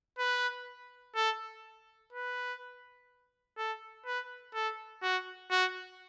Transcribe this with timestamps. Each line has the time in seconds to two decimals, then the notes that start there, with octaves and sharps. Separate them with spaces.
0.18 B4
1.15 A4
2.13 B4
3.58 A4
4.06 B4
4.54 A4
5.02 F#4
5.51 F#4